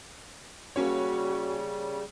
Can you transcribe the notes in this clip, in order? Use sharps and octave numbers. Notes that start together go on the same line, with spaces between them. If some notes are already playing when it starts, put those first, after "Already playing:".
C#3 G3 A#3 C#4 F#4 C#5